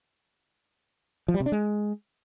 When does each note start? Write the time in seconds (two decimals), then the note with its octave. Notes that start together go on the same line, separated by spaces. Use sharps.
1.28 F3
1.34 G3
1.40 C3
1.46 D4
1.52 G#3